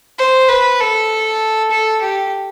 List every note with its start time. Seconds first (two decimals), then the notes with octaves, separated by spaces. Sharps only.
0.19 C5
0.49 B4
0.80 A4
1.71 A4
2.02 G4